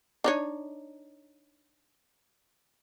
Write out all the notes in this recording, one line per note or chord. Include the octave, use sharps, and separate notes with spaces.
D4 D#4 C#5